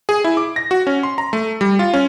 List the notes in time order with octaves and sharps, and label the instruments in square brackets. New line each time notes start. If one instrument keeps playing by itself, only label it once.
[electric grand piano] G#4
E4
D6
A#6
F#4
C#4
C6
A#5
A3
G3
F4
C#4